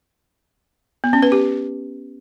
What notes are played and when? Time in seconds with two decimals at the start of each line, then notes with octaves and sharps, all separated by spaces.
1.04 B3
1.13 C#4
1.23 B4
1.32 G4